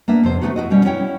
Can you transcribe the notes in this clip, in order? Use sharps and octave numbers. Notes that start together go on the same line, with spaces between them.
A#3 B3 D4 E5
F2 C3 C5
C#3 G3 A3 B3 D#4 F#4
E4 F#4 D#5
B2 G3 C#4
C#4 E4 C#5 F#5 G5